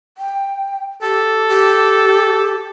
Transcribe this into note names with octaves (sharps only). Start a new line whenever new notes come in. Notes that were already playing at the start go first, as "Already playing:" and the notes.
G5
G4 A4
G4